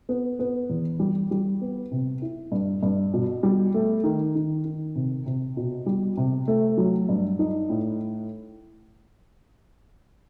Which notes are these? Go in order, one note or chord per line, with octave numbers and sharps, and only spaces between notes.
B3
B3
E2
G3
G3
B3
C3
E4
G2
G2
B2
G3
A3
D#3
D#3
D#3
C3
C3
B2
G3
C3
A3
F#3
G2
D#4
A2